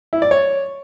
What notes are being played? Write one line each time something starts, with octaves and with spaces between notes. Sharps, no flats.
E4
D5
C#5